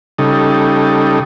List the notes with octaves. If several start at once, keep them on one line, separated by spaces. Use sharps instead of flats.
C#3 G3 D#4 A4